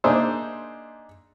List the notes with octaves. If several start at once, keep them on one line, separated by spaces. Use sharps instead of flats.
A#3 D4 D#4 G#4 C5 E5